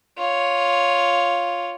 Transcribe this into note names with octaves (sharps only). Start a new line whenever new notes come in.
F4 C#5